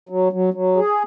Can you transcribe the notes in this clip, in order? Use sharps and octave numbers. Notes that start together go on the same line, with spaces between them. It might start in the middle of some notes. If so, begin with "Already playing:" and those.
F#3
F#3
F#3
G#4